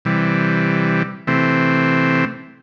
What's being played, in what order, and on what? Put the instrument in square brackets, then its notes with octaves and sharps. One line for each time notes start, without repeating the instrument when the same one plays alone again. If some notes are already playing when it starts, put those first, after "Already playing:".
[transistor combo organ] C3 E3 G3
C3 E3 A3 C4